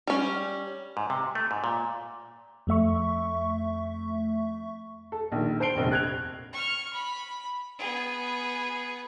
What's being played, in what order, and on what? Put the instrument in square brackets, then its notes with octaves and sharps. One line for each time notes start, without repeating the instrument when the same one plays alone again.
[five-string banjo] G3 C#4
[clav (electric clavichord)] G#2
C3
A3
G#2
A#2
[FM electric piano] F2 A3 E5 C#6
[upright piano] A4
A#1 D#3
C5 A5 C7 D7 G7
F1 A#1 D#2
F#6 G#6 F7
[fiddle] C#6 F6
B5
B3 G#4